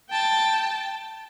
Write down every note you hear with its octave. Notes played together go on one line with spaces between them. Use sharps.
G5 A5